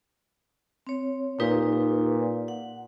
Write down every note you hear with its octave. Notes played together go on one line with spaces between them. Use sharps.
C4 C#5
A#2 D#4 G4 B4
F#5